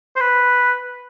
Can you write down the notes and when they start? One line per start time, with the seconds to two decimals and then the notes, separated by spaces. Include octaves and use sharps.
0.16 C5
0.21 B4